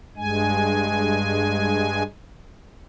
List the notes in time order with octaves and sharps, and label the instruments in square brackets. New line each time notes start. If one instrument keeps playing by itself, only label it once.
[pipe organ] G2 G#3 G#5